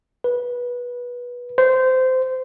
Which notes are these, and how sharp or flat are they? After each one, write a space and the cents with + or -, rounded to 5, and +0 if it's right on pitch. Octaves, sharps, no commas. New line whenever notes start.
B4 -20
C5 -20